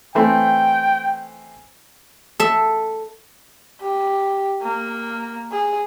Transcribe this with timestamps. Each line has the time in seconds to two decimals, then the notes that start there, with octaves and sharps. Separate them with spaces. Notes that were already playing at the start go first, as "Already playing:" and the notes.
0.15 E3 A3 C4 G5
2.40 A4 E5
3.81 G4
4.63 A#3
5.51 G#4